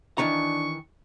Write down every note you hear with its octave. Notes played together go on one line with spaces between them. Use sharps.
D#3 E3 D4 A#5 C#6